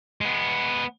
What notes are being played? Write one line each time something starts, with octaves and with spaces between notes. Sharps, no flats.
G#3 B3